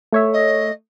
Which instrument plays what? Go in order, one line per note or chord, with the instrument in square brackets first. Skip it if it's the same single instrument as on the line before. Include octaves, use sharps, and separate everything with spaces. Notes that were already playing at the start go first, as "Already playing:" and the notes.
[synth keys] A3 C#5 E5
[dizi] D#5